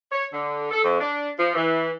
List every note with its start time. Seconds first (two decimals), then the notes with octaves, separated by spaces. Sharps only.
0.12 C#5
0.33 D3
0.71 A4
0.84 F2
1.00 D4
1.39 F3
1.55 E3